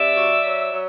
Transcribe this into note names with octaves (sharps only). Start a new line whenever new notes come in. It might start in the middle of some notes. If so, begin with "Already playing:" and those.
Already playing: C3 D5 E5
F#3
F#3
F#3